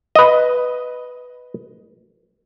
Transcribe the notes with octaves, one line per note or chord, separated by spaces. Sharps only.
B4 D#5